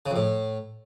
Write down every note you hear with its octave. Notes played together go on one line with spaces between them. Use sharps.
C#3
F2
A2